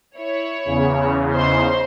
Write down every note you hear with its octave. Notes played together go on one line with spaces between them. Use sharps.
E4 C#5
E2 C#3
D#4 C5 C6